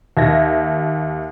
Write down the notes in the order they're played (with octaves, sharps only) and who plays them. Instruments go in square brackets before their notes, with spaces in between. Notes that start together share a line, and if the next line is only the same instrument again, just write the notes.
[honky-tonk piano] D#2 E5 G#6 A#6